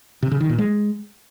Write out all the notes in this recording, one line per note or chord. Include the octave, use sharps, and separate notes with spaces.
C3
C#3
D#3
A#2
G#3